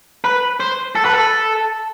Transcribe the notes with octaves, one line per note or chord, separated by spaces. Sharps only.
B4
C5
A4
B4
A4